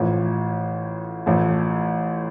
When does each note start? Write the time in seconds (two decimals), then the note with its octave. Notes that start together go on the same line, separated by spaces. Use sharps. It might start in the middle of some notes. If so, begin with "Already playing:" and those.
Already playing: A1 A2 F3
1.26 A1 A2 F3 A3